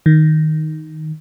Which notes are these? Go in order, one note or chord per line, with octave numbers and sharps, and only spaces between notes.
D#3